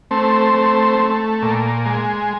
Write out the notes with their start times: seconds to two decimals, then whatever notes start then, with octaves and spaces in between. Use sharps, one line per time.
0.11 A3 C4
0.54 A3
0.99 A3
1.42 A#2
1.86 G#3